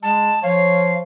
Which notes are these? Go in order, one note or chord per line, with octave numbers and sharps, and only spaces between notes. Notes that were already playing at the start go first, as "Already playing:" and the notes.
G#3 A5
F3 C#5 F5